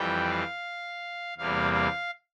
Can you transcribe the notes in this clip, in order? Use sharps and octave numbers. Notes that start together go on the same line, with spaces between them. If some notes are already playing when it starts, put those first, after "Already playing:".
Already playing: F2 E3 G3 G5
F5
E2 C3 G3 A#3 F5
F5